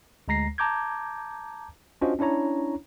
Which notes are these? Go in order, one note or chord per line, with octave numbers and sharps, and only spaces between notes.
D2 G#3 A#5 A#6 C7
A5 A#5 D6 G6 G#6
C#4 D4 F4 F#4 C5 D#5
C#4 D4 E4 C#5 A#5